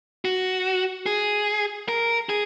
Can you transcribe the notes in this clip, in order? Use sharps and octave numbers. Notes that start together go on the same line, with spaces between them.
F#4
G#4
A#4
G#4